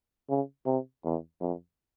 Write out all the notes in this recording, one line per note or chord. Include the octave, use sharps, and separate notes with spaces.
C#3
C3
E2
F2